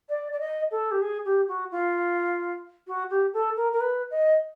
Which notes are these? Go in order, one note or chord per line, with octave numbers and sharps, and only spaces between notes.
D5
D5
D#5
A4
G4
G#4
G4
F#4
F4
F#4
G4
A4
A#4
A#4
B4
D#5